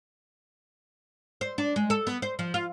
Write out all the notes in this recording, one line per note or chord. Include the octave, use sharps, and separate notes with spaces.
C5
D4
G#3
A4
B3
C5
F3
F4